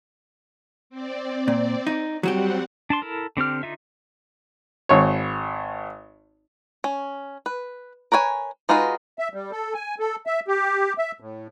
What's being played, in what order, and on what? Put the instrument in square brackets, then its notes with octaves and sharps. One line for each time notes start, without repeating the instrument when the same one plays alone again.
[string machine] C4 D5
[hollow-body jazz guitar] A#2
D#4
[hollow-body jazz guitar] F#3 F#4 G4 [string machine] G3 C4 F#5
[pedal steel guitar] D4 A5 C6
E4 A4 A#4
D3 C4 G4 F6
D3 D#4 F4 E5
[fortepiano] G#1 C#5
[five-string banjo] C#4
B4
A#4 B4 C#5 G#5
G#3 D#4 F4 F#4 B4
[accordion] E5
G3
A4
G#5
A4
E5
G4
E5
A2